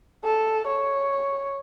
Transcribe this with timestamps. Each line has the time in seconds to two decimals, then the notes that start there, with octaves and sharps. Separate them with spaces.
0.24 A4
0.67 C#5